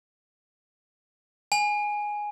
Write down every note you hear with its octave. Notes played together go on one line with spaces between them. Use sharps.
G#5